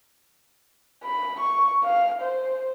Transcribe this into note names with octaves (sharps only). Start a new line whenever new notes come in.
B5
C#6
F5
C5